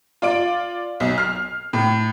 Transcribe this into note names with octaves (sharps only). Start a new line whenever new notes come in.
F4 D5 D7
B1
F6 C7
A2